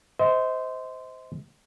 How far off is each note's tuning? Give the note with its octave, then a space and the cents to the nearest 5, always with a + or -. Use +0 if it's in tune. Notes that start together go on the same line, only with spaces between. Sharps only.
C5 -15 D#5 +35